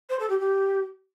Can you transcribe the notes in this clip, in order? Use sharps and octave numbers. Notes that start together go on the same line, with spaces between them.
C5
A4
G4
G4